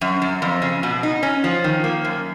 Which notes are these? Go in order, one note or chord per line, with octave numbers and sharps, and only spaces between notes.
F#2
F#2
F2
C#3
B2
D#4
C#4
F3
D#3
A#3
F#2